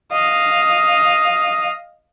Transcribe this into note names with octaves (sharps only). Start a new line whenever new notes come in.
D#5 F5